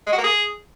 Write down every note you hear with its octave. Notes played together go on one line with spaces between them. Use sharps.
G#3
F#4
A#3
G#4